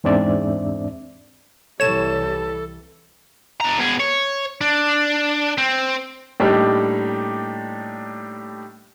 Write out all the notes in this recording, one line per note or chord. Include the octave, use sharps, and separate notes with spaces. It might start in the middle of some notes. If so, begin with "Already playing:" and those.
E2 G#2 C4 D4 D5 E5
C2 E3 G3 A4 C#5 E7
D4 A#5
B2 G#4
C#5
D4
C4
A2 G3 A#3 D4 D#4 G4